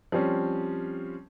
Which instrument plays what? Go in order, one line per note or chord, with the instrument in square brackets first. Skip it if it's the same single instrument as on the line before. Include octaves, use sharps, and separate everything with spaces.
[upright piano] F3 G3 C4 C#4